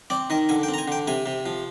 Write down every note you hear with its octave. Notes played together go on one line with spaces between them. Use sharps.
C4 D5
D#3 D#5
D3 G#5
G5
C4
A#5
G#5
D3 G5
C3 G#5
C3
F3